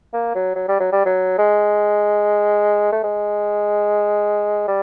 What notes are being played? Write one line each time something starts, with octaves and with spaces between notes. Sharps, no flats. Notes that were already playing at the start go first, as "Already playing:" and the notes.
A#3
F#3
F#3
G3
F#3
G3
F#3
G#3
A3
G#3
G3